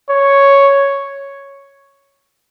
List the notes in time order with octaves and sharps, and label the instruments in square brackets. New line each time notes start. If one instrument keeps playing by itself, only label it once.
[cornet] C#5